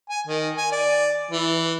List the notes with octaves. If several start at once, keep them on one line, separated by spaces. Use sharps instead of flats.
G#5
D#3
G#5
D5
E3